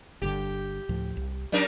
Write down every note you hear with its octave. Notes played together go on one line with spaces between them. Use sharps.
G1 G2 D3 G4
D2 A2 F3
C2
F#3 G3 C#4 A#4